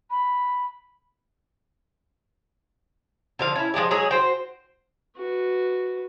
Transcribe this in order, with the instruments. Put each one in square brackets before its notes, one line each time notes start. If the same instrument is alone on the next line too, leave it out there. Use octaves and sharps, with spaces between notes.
[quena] B5
[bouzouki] D3 F3 F5
C#4 E4
F3 G#3 D4 G4
F#3 G#3 G#4 C#5
F#4 C5 G5
[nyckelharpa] F#4 B4